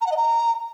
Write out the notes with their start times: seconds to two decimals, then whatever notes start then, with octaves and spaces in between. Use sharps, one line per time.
0.01 A#5
0.06 F#5
0.11 D#5
0.16 A#5